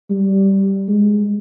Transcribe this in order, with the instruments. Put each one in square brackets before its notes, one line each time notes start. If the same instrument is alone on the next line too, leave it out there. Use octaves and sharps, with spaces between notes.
[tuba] G3
G#3